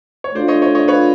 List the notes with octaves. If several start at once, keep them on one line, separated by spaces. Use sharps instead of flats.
C#5
A3 D4 F4 C5 D5
C#5 D#5
C#5 D#5
C#5 D#5
B4 C#5